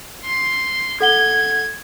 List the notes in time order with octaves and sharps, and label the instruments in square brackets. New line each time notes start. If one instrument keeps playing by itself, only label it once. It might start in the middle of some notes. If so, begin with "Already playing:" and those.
[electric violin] C6
[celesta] A4 F#5 G7 [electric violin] G#6